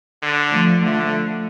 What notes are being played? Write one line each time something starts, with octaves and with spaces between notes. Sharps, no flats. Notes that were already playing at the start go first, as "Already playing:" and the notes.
D3
F3 A3
D3 F3 A3